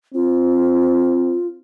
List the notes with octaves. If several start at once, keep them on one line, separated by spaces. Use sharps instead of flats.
C4 F4